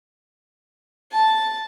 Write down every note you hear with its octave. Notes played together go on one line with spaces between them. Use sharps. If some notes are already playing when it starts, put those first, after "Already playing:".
A5